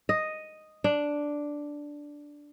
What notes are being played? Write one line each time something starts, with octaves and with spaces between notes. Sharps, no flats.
D#5
D4